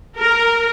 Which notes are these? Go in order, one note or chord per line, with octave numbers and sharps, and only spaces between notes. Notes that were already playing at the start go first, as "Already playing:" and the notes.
A#4